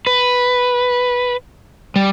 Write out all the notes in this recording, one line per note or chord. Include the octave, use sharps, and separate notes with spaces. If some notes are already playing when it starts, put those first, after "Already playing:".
B4
G3